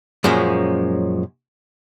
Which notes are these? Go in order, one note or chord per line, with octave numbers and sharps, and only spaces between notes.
F#2 A#2 F3 G#3 C#4